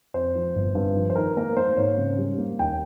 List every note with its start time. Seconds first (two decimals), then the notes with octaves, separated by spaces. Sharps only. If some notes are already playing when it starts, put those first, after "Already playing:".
0.14 F2 C5
0.35 F3
0.56 G1
0.75 G2
0.96 F3
1.10 C5
1.16 D#3 A#4
1.37 A#3 A#4
1.56 A#3 C5
1.77 G#2 C#5
1.98 C#3
2.18 G3
2.38 A#3
2.59 D#2 G5